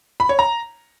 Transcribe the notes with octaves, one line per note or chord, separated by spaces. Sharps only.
B5
C#5
A#5